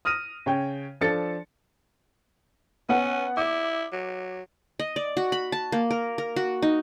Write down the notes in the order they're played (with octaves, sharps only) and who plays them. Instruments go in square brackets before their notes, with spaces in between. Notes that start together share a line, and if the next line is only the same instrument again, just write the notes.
[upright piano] D#6 F6 A#6 D#7
C#3 C#5 G5
F3 D4 A4 A6 C#7
[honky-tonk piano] B3 F#5 [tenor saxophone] C#4
[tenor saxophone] E4 [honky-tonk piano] D6
[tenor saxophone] F#3
[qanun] D#5
D5
F#4
B5
A5
A#3
A#4
A#4
F#4
D#4